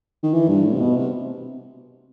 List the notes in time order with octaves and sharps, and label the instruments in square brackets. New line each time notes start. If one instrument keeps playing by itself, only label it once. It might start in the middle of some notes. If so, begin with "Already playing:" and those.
[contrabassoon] D#3
E3
G2
A2
C3
B2
C3